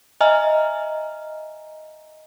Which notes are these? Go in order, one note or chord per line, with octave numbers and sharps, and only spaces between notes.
D#5 E5 G#5 A#5 F6